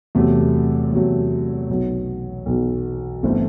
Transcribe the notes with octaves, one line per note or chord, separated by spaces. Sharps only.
E2 C3 F#3 A3
E2 C3 F#3 A3
B1 B2 F#3
B1 B2 F#3
G1 E3 A3 C4